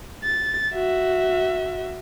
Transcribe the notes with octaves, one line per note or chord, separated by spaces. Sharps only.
A6
F#4 E5